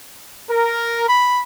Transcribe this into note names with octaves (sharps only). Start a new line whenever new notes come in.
A#4
B5